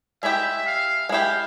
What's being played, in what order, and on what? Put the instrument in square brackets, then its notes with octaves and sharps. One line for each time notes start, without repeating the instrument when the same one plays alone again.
[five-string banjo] G#3 E4 G4 [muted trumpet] E5
[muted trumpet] F5
[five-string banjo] G#3 E4 G4 [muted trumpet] F5